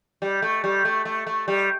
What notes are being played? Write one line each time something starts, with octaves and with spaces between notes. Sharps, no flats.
G3
A3
G3
A3
A3
A3
G3